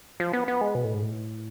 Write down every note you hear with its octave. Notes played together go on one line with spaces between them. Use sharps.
F3
B3
B3
G#3
B2
A2
G#2
A2